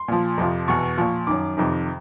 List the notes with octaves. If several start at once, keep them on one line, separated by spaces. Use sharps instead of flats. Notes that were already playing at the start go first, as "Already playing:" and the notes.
Already playing: C6
A#2 F3
F2 C3 F3
E2 B2 C#6
A#2 F3
F#2 D#3 D6
F2 C3 D#3